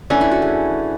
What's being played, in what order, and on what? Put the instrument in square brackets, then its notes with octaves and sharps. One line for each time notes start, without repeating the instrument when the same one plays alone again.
[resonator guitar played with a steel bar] E3 A3 C#4 [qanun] D4
[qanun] E4
F#4
G#4